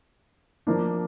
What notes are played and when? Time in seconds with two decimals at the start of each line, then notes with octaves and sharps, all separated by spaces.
0.67 F3 A#3 D4